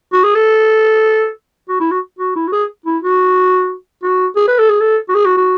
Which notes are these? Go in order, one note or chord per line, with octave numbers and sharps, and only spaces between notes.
F#4
G#4
A4
F#4
E4
F#4
F#4
E4
F#4
G#4
E4
F#4
F#4
G#4
B4
A4
G#4
A4
F#4
G#4
F#4
F#4